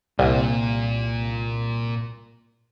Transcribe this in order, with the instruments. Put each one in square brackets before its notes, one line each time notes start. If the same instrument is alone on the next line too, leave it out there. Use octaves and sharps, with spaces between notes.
[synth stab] C2 [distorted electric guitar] A#2